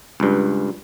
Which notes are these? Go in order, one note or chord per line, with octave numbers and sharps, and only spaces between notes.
C#2 G2